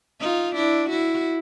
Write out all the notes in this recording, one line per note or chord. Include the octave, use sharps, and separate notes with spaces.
D#4 F4
D4 E4
E4 F#4